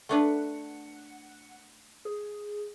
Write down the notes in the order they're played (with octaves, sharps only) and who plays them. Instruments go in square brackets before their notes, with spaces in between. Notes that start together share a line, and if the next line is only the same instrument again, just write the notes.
[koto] A3 D4 B4 [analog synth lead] F#5
[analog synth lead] G#4